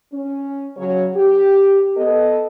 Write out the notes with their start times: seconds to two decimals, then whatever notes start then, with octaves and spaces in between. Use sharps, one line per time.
0.12 C#4
0.76 C#3 F#3 C#5
1.15 G4
1.96 B3 A4 D#5